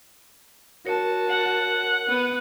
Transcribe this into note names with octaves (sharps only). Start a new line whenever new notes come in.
F#4 A#4 C#5 A5
F#5
B3 B4